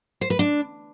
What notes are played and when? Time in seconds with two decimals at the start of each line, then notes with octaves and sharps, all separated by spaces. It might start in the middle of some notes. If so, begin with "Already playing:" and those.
0.21 C5
0.30 B4
0.39 D4